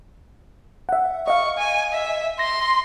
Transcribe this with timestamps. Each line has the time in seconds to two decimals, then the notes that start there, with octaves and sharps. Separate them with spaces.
0.89 E5 F#5
1.28 D#5 F5 C#6
1.58 G#5
1.93 E5
2.39 C6 A#6